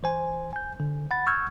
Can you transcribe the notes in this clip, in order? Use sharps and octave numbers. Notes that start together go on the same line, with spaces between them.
E3 C5 G#5
G#5 G6
D3
F#5 B5 A6
C#6 E6 F6 G6 G#6